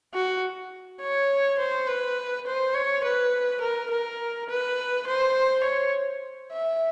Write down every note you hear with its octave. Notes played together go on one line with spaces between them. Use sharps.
F#4
C#5
C5
B4
C5
C#5
B4
A#4
A#4
B4
C5
C#5
E5